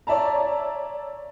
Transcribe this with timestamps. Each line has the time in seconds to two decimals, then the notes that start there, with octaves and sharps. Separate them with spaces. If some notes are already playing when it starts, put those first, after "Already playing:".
0.07 C#5 D5 E5 A5 A#5